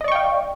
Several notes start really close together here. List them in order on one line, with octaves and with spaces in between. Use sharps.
D#5 D5 C#6 G5 F5